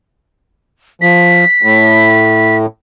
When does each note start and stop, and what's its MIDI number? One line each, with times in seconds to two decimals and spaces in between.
1.02 1.45 53
1.02 2.56 95
1.63 2.66 45